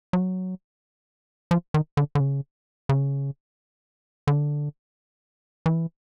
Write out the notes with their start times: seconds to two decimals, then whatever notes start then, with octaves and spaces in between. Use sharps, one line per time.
0.13 F#3
1.51 F3
1.74 D#3
1.97 D3
2.15 D3
2.20 C#3
2.89 C#3
4.27 D3
5.66 E3